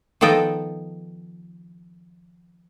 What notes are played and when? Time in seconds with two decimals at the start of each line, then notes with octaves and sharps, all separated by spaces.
0.21 D#3 F3 B3 A4 D#5 G5